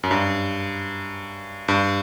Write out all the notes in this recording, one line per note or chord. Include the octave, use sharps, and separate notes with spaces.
F#2
G2
G2